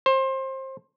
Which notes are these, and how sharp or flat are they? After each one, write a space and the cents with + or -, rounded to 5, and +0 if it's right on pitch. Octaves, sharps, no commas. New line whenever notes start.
C5 +25